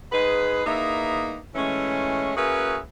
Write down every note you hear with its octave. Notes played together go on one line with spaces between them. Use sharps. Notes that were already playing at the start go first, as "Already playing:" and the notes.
G#2 D#4 G#4 B4
E2 A#3 B3 D#4 E5
E3 G#3 A3 C#4
A#3 C#4 F#4 G#4 B4 E5